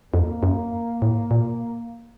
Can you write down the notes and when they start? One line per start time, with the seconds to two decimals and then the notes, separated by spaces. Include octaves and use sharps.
0.14 F2 A#3
0.43 F#2
1.02 A2
1.31 A#2